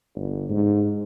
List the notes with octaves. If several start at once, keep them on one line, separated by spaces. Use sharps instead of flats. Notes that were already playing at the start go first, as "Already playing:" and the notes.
G1
G#2